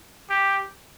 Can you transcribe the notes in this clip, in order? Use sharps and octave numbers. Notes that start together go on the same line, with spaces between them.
G4